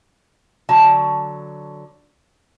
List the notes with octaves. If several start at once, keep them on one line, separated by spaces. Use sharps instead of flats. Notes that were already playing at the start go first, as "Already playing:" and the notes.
D3 F#3 A5